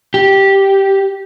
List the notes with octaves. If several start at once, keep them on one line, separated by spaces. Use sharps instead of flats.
G4